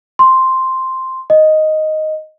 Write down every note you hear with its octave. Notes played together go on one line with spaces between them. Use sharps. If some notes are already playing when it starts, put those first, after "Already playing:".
C6
D#5